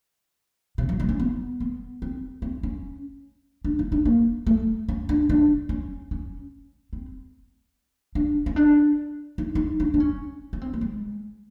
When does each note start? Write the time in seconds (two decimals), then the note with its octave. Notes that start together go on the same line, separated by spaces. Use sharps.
0.78 C3
0.89 F#3
1.00 G3
1.09 C#4
1.20 B3
1.60 B3
2.02 C4
2.42 C4
2.63 C#4
3.64 D4
3.79 D#4
3.92 D4
4.05 A#3
4.47 A3
4.89 C#4
5.09 D4
5.29 D4
5.69 C#4
6.11 C#4
6.93 C4
8.15 D4
8.46 C#4
8.56 D4
9.38 D#4
9.55 D#4
9.80 D4
9.94 D4
10.00 C#4
10.53 C#4
10.62 C4
10.73 A3
10.81 G#3